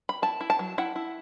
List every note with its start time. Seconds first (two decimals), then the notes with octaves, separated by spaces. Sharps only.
0.09 B5
0.22 E4 A5
0.40 E4
0.50 A5
0.59 F#3
0.78 E4 F#5
0.95 E4